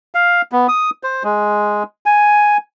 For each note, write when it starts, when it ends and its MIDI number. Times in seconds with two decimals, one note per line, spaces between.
0.15 0.42 77
0.52 0.67 59
0.68 0.90 87
1.03 1.23 72
1.24 1.83 56
2.06 2.57 80